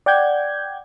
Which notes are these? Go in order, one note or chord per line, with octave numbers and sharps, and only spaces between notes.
D5 F#5 G5 G6 G#6